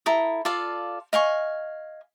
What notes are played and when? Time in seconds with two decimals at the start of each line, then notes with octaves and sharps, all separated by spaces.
0.06 E4 A4 A#5 D#6
0.45 F4 A4 D5 F5
1.13 D#5 F5 G#5 C#6